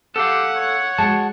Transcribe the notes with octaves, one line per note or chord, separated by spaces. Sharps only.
G4 A4 F5 F#5
C#5
G#3 F#4 F#5 A5